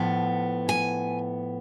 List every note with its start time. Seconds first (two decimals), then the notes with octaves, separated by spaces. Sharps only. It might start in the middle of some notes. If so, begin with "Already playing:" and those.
Already playing: A2 F3 B3
0.69 G#5